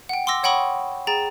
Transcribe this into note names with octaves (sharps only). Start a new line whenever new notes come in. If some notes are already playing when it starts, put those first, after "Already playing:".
F#5 G5
C6 D6 E6 A#6
C#5 F#5 G5 B5 C#6 D#6
G#4 G5 A#5 A6 E7